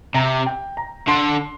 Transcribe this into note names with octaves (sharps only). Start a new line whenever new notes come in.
C3 A#5
G5
A#5
D3 C6